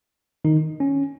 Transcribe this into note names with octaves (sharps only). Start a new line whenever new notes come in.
D#3 D#4
C#4